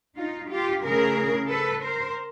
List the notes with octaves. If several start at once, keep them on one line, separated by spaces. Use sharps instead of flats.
D#4 F4
F4 G4
C#3 E3 A3 G#4 A#4
A4 B4
A#4 C5